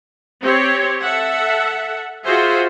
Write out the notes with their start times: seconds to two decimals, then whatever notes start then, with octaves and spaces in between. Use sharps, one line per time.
0.42 C4 G4 C#5
1.02 A4 E5 F#5
2.24 F4 F#4 G#4 C5 E5